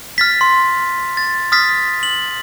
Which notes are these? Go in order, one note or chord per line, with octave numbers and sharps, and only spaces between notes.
F6 A6 B6
C6
A6
D#6 F6 A6 B6
F#7